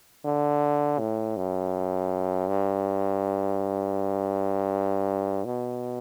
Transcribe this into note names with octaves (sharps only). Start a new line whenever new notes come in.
D3
A2
F#2
G2
B2